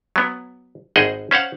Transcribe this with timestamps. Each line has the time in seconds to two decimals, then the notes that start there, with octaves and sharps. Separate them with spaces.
0.16 F#3 B3
0.96 G#1 G#4 C5 D#5 F#5
1.31 C#4 C5 F5 F#5